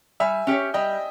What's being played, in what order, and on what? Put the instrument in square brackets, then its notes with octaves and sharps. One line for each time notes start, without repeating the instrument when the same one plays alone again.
[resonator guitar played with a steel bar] G3 [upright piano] E5 G#5
[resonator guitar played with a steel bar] C#4 G4 C#5
[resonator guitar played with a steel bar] G3 [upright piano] D#5 G5